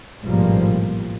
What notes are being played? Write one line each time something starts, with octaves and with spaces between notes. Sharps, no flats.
A1 G#2 B2 F3 G3 A#3